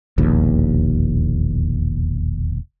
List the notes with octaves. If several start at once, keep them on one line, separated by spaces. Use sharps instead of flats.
E1 A#1 D#2